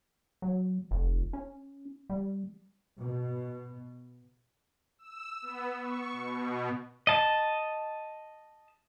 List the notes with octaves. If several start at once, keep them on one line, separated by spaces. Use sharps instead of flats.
F#3
F1
C#4
G3
B2
E6
B3
C#6
B2
D#5 A5